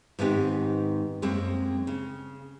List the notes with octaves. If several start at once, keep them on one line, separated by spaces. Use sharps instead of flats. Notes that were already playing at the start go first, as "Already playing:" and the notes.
G#2 D#3 B3 C4 G4 G#5
F#2 G#3 A#3 C4
C#3